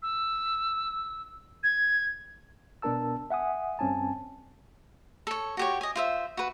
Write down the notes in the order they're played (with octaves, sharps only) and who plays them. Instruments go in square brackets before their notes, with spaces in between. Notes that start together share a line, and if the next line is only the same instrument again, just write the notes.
[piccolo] E6
G#6
[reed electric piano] B2 B3 D4 A#4 A5 E6
E5 F#5 G#5 D#6
G2 C4 C#4 G#5 A5
[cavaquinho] A4 C#5
F#4 G4 C#5
D#5 G#5
F4 C5 E5
F#4 B4